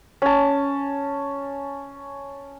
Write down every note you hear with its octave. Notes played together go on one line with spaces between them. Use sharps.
C#4 A5